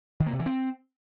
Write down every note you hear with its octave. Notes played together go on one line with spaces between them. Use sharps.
D#3
A#3
C3
E3
C4